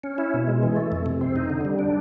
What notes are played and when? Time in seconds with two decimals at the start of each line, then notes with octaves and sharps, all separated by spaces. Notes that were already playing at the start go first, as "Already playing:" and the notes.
0.04 C#4
0.18 E4
0.34 B2
0.48 G#3
0.63 E3
0.76 A3
0.92 F2
1.06 C3
1.21 C4
1.36 D#4
1.50 D3
1.65 G3
1.79 D4